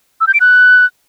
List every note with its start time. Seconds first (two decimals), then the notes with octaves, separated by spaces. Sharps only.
0.21 E6
0.27 G6
0.34 D7
0.41 F#6